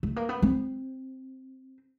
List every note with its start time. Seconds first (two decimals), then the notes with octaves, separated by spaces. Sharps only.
0.03 A3
0.16 A#3
0.29 B3
0.42 C4